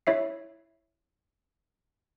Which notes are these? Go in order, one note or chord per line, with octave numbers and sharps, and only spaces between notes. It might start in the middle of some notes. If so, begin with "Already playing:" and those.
E4 C#5 E5 C7